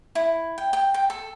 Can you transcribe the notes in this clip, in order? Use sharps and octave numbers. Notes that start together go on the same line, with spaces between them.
E4
G5
G5
G5
A4